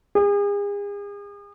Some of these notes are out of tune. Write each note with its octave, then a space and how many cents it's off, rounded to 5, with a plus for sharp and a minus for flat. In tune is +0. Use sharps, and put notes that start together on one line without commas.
G#4 -40